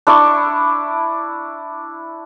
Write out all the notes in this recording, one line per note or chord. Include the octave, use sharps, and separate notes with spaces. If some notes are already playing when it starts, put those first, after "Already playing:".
D4 E4 D5 C#6